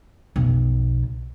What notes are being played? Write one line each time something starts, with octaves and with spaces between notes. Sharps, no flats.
B1 F2